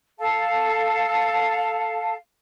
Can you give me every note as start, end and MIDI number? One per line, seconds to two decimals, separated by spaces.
0.18 2.13 69
0.18 2.13 77
0.18 2.13 81